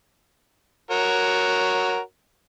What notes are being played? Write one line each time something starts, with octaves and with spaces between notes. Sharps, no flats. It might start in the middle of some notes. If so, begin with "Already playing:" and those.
F#4 A#4 C#5